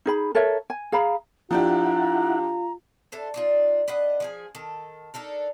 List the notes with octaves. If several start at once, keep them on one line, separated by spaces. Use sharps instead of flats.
D#4 G#4 B5
A4 A#4 C#5 E5
G#5
G#4 F5 A#5 B5
F3 D4 E4 F4 G4 F#5 A#5
D4 E4 A4 C5
D4 D#4 F4
D4 B4 D#5 F#5
F3 G#4 G#5
D#3 A4
D4 D#4 A4 A#4